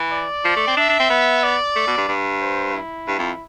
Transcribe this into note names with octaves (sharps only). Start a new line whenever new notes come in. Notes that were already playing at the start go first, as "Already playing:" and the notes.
Already playing: E3
D5
F3
A3
C4
D4 E5
D4
C4
B3
D5
A3
B2
G2
G2
C5
E4
G2
F2